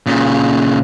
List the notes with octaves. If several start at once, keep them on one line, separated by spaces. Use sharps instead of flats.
A#2 C#3